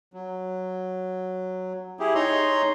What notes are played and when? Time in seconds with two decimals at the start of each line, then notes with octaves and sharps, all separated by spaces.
0.13 F#3
2.00 E4 G4 G#4
2.15 D#4 C#5 A#5 C6